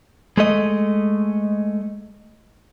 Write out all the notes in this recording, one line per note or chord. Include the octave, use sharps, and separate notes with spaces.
G#3 A3 D#5